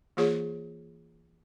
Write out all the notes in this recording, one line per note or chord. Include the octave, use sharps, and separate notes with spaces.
E3 A#3 F4 G#4 C#5